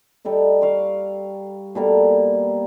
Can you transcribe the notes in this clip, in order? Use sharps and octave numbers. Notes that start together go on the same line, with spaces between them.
G3 D#4 A4 D#5
F5 C#6 D6
B2 G3 A#3 A4